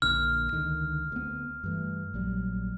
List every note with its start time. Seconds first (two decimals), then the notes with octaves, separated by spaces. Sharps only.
0.02 A#1 A#2 D3 F6
0.53 C#2 D3 D#3
1.12 D2 B3
1.64 G2 E3 A3
2.14 A#1 F#3 G3